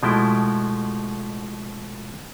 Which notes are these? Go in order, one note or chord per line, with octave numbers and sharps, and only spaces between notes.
B2 F3 G#3 A3 E4 G5